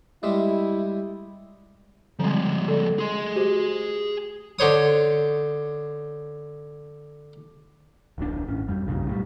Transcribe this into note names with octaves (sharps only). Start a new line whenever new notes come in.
G3 G#3 E4 E5
D3 F3 G3 G#3 C4
A4 D5
G#4 C6
F#4 G4 C5
D3 C5 C#5 D#6
D1 A#1 A2 D4
G#1 C#4
F2 G3
B1 G2 A#2 C#3
A2 F#3 G3